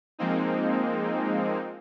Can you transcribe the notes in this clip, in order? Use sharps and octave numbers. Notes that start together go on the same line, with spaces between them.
F3 G#3 A#3 C4 D#4